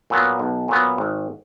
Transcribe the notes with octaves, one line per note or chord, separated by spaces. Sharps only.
A#2 F#3 B3
B1
A#2 F#3 B3
G#1